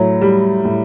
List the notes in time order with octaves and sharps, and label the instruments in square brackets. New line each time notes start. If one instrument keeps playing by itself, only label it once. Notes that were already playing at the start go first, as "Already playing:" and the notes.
Already playing: [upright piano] A2 [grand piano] F#3
[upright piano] G3
A2